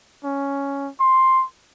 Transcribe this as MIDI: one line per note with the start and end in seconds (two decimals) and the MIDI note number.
0.24 0.90 61
1.00 1.44 84